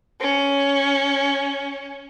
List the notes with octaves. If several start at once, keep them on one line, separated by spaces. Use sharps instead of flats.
C#4